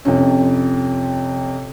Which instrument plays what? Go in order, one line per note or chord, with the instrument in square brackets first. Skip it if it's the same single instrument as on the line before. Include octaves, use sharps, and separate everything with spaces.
[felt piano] F2 C3 C#4